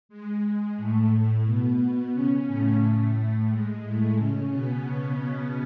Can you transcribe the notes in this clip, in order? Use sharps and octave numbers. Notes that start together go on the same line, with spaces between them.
G#3
G#3
A2 A3
A2 A3
B2 B3
C#3 C#4
A2 A3
G#3
A2 A3
C#3 C#4
B2 B3